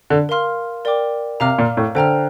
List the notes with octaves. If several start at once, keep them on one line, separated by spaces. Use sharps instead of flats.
D3
A#4 F5 C6 F6
A#4 D5 G5 D6
C3 F5 A#5 D6 F6
A#2
A2
D3 C5 G5 A#5 F6